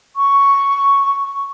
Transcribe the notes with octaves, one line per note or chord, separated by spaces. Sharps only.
C#6